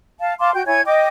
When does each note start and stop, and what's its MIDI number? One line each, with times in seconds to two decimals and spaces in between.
0.19 0.34 77
0.19 0.34 81
0.39 0.51 77
0.39 0.51 81
0.39 0.51 84
0.39 0.51 86
0.54 0.63 66
0.54 0.63 79
0.54 0.63 91
0.66 0.81 64
0.66 0.81 73
0.66 0.81 80
0.66 0.81 92
0.86 1.08 75
0.86 1.08 79
0.86 1.08 86